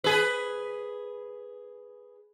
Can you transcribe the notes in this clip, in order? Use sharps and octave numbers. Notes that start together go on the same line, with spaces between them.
G#4 B4